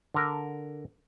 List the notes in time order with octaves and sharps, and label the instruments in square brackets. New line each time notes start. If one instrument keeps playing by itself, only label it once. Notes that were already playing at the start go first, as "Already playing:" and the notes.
[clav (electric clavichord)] D3 A#4